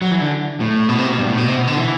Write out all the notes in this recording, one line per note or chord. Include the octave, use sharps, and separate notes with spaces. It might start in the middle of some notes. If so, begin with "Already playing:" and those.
F#3
E3
D3
A2
B2
C3
B2
G2
A2
B2
C3
B2
D3
E3